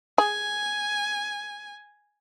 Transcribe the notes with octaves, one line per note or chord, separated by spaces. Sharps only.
G#4 G#5